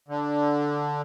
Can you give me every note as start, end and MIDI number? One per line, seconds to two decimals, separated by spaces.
0.08 1.02 50